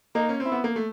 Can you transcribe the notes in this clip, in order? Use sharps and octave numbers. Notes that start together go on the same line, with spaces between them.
A#3 D#4
C#4
C4
E4
B3
A#3
A3